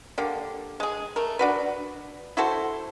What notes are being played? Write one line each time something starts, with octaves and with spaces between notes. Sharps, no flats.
D3 A#3 G4
G#3 G#4
A3 A#4
D4 F#4 B4
E4 F#4 A4 C5